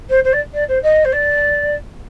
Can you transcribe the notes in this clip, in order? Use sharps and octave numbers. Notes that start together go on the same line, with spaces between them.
C5
C5
D5
D5
C5
D#5
C5
D5